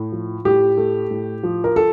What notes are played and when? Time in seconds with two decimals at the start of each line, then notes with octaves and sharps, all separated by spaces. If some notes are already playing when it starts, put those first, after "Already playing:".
Already playing: A2
0.12 F3
0.45 A2 G4
0.77 A3
1.11 A2
1.43 F3
1.64 A#4
1.76 A4